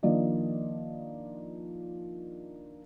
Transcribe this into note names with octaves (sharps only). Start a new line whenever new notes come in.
D#3 F3 A#3 D4 D5 D#5